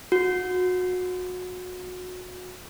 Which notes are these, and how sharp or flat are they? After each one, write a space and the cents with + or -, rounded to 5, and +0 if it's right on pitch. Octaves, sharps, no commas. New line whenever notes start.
F#4 -25